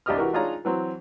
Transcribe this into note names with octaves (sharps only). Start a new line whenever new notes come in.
C2 D4 G4 D#5 D#6 F6
E3 F#4 G4 A#4
D4 D#4 F4 G#4 C#5 A#5
E3 F#3 C4